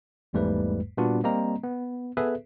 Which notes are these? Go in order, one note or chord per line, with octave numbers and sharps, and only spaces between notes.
G#1 E2 G#2 G3 A3 B4
A#2 G3 B3 D4 F4 F#4
G3 A#3 C4 D#5 A#5
B3
B3 G#4 A4 B4 E5